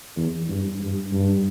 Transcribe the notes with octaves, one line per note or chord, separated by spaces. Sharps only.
E2
G2
G2
G2